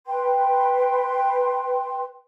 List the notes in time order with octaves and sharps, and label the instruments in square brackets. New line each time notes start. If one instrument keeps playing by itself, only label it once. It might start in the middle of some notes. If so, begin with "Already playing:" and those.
[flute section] B4 G5 C6